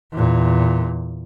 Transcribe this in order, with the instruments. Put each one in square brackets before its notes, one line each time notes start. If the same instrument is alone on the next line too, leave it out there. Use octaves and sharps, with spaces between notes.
[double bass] E2 A#2